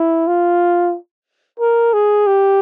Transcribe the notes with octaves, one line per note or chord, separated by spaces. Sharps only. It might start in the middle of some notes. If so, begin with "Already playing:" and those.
Already playing: E4
F4
A#4
G#4
G4